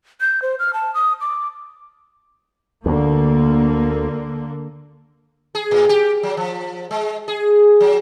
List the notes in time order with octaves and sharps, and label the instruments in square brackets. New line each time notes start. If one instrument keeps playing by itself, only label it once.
[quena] G6
C5
F6
A5
D#6
D6
[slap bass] D2 [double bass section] D3 A#3
[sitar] G#4
A2
G4
F#3
F3
G#3
G#4
F#3